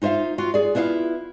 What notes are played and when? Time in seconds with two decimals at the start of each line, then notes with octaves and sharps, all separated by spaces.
0.02 D#4 F4 C5 E5 F5
0.38 F4 F#4
0.54 G#4 D5
0.75 B3 E4 F4 D#5 F5